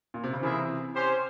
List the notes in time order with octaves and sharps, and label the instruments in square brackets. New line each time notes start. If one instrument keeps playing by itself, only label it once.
[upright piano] A#2
C3
C#3
[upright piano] C3 E3 [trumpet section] A#3 E4 G#4 E5
[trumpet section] C#4 G4 C5